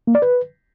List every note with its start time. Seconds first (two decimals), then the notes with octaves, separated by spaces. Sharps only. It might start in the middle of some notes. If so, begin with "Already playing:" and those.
0.07 A#3
0.15 D5
0.22 B4